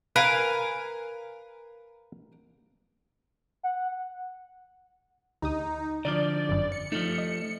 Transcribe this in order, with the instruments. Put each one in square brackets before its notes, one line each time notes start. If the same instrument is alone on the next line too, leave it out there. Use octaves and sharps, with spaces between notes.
[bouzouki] A#4 F5 G#5 [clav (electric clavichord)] B4
[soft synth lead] F#5
[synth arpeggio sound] D2 G4 D#6 [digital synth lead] D#4
[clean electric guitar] D3 E3 F3 [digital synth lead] D5
[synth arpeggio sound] G1 F#2
[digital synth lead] C#7
[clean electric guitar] F3 A3 [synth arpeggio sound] D#4
[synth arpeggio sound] D#5